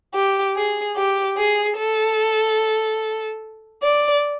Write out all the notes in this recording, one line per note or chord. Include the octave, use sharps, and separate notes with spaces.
G4
G#4
G4
G#4
A4
D5